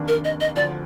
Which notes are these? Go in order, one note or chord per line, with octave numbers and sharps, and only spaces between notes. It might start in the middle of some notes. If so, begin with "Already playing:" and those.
Already playing: F1 D#2 D#3 A#3 D4
A#4
D#5
D#5
D2 D3 F3 D5